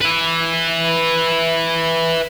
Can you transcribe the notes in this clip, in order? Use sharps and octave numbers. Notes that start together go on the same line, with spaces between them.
B4 E5